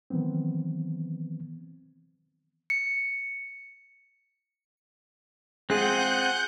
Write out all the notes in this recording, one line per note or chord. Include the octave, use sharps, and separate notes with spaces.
D#3 E3 F#3 B3 C4
C#7
G#3 C4 F4 G#4 F#5 F#6 G6